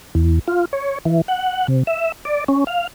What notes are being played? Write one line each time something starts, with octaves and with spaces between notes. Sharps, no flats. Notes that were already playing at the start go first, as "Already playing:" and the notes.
E2
F4
C#5
E3
F#5
C3
E5
D5
C#4
F5